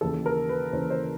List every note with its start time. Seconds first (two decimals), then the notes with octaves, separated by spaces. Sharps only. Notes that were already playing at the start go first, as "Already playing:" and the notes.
0.01 D#2 C#3 E3 A4
0.26 A#4
0.49 B4
0.73 D#2 C#3 E3 C5
0.90 C5